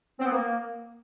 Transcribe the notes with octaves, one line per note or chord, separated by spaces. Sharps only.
C4
B3
A#3